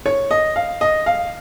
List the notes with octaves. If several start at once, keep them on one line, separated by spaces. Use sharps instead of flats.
C#5
D#5
F5
D#5
F5